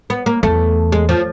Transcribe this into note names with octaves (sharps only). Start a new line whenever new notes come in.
B3
A#3
E2 A3
G#3
F3